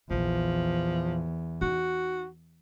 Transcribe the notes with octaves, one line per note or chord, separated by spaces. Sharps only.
A#1 E2 F3
D#4 F#4